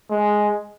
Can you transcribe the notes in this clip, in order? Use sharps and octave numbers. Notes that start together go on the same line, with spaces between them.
G#3